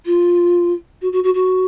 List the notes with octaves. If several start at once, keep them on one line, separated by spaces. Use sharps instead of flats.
F4
F#4
F#4
F#4
F#4